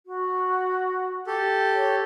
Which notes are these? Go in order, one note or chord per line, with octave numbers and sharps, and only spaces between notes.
F#4
G4 A4
C#5